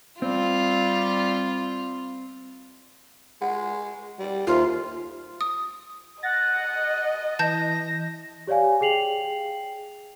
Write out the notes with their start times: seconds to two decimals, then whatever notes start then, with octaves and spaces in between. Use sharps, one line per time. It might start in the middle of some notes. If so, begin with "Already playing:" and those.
0.22 G3 C4 F4
3.42 G#3 F#5
4.19 G3
4.47 D#2 F4 A4 C5 E5
5.41 D#6
6.23 D#5 F#5 A6 A#6
7.39 E3 A5 G6 A#6
8.47 G4 C#5 D5 F5 G#5
8.81 G#4 G5 C7 F7 F#7